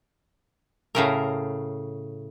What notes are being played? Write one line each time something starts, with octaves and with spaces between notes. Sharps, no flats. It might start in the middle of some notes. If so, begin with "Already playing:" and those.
A2 C#3 A#4